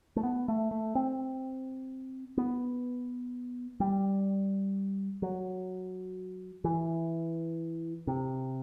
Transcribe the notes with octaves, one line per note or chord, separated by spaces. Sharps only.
A3
B3
A3
A3
C4
B3
G3
F#3
E3
C3